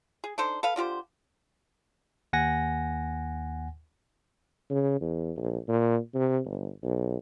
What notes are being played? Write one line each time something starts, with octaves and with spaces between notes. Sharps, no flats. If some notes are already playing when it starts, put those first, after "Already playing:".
G#4
D4 D#4 A4 C5
A4 B4 F5
D3 F4 G4 C5
D#2 F#5 G#5 A#6
C#3
E2
A#1
A#2
C3
G1
B1